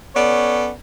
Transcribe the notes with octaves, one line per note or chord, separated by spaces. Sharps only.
B3 C#4 A4 C#5 D5